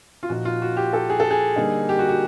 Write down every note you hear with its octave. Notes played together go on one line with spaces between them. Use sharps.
F4
A#2 F3 A#3 D#4 F#4
F4
F#4
G4
A4
G#4
A4
G#4
D3 G3 A#3 D#4
G4
F#4
F#4